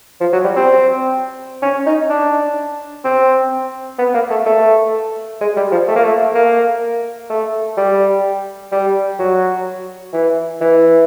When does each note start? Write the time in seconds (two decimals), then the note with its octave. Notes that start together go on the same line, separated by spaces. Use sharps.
0.21 F3
0.32 F#3
0.44 G3
0.56 C4
1.62 C#4
1.86 D#4
2.09 D4
3.05 C4
3.98 B3
4.14 A#3
4.30 A3
4.46 A3
5.41 G#3
5.57 G3
5.72 F3
5.88 A3
5.96 A#3
6.03 A3
6.35 A#3
7.30 A3
7.77 G3
8.72 G3
9.19 F#3
10.13 E3
10.61 E3